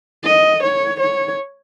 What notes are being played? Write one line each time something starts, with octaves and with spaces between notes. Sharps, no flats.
D#5
C#5
C#5